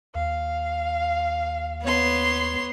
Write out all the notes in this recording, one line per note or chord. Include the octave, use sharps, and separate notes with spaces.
D#2 F5
B3 C#5 C6